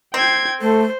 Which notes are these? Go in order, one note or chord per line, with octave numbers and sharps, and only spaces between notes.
C4 G5 G#6
A3 A4 C5